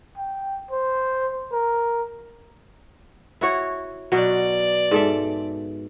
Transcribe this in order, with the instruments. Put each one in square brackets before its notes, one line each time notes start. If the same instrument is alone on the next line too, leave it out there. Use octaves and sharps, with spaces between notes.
[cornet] G5
C5
A#4
[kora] E4 F#4 C#5
[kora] B2 F#3 [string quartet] D5
[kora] G#2 A4 E5